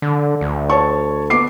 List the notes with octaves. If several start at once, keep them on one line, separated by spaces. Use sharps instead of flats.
D3
D2
C#5 A5 C#6
B3 D6 C7